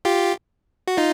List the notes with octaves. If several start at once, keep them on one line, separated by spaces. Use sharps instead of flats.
F4 G4
F#4
D#4 F4